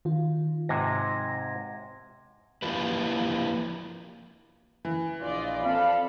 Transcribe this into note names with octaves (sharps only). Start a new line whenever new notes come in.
D#3 F4
G#2 C3 G#6 A#6
F3 A#3 E4 F4 G4 B4
E3
A#1 F4 D5 D#5
C4 A4 F5 B5